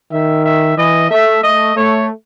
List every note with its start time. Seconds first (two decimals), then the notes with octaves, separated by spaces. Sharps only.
0.11 D#3 E5
0.45 E5
0.77 E3 D#5
1.10 A3 E5
1.43 A3 D#5
1.76 A3 C#5